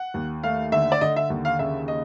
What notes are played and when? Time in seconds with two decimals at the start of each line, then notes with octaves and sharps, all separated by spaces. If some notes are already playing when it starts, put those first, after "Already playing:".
Already playing: F#5
0.14 D#2
0.44 A3 F5
0.72 D3 E5
0.92 D5
1.01 D3 D#5
1.16 E5
1.30 D#2
1.45 F5
1.59 C#3 E5
1.88 D#5